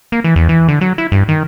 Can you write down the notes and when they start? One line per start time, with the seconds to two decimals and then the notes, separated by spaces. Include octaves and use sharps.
0.12 A#3
0.24 E3
0.36 E2
0.49 E3
0.68 D3
0.81 F#3
0.98 E4
1.12 G2
1.29 D#3